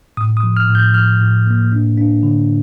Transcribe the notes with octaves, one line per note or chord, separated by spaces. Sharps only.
A2 D#6
D#6
F3
F6
A2
G6
F3 F6
A2
A#3
D4
D4
D3